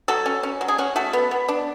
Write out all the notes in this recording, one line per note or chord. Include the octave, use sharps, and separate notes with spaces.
F#3 F#4 A4
C#4
C#4
F#3
G#4
C#4 F#4
A3 F#4 A4
B3
B3
D4